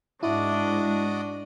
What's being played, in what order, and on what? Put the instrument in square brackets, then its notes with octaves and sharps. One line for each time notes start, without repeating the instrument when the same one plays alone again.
[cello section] G#2 [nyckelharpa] D4 [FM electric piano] E4 [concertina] F#4 D5 D#5